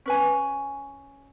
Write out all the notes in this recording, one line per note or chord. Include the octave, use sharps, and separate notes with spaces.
C#4 B4 G#5